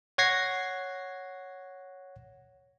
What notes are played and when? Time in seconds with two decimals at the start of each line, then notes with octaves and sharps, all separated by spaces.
0.18 C#5 F#5 G#6 A#6 C7